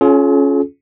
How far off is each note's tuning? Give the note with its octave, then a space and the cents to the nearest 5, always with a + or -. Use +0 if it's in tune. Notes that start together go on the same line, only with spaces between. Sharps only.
C#4 +0 F4 +0 G#4 +45